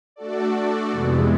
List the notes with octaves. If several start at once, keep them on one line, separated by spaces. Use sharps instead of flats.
A3 D4 F#4 A4 D5
F2 C3 E3 G#3 B3